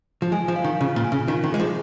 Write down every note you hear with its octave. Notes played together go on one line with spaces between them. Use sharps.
F3
G#3 G#5
F3
F5
D#3
C#3 F4
A#2
G#5
C#3
D#3 F4
D#3
G#3 G#4
F3